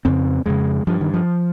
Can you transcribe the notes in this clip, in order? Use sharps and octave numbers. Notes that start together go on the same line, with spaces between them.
F2 C#3 C4
F2 C#3 G#3
G2 F3
D#3
F3